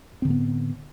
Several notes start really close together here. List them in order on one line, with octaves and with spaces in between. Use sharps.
C4 D3 A2 B3